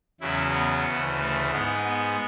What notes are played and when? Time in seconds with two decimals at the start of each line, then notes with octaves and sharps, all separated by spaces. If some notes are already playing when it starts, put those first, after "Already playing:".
0.21 E2 C#3 F#3 E4
0.54 B3
0.86 D2 C#3 E3
1.18 A3
1.51 G#2 G#3 B3
1.84 B3